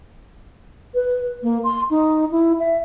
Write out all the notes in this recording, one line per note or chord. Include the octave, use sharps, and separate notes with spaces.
B4
A#3
C6
D#4
E4
E5